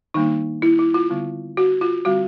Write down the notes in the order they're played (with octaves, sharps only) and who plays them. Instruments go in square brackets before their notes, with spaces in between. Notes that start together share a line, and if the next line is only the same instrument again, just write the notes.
[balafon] D#3 G3 A#3 D4 D#4
E4
E4
F4
D3 G3 B3
F#4
F4
D3 G3 C4 F#4